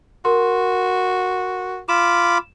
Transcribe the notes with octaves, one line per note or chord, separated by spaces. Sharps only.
F#4 A#4 C6
F4 B5 D6 E7